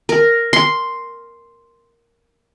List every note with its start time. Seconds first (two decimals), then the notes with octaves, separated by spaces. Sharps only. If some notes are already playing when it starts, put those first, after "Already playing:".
0.09 A#4
0.53 C6